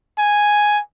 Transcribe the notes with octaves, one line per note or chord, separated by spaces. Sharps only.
G#5